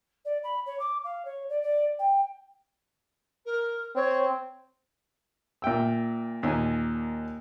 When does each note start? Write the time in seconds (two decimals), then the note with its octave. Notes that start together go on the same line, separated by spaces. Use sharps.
0.25 D5
0.43 B5
0.66 C#5
0.79 D6
1.04 F5
1.25 C#5
1.49 D5
1.62 D5
1.99 G5
3.45 A#4
3.95 C4 C#5
5.62 A#2 E5 G5 E6
6.43 D#2 A#2 G#5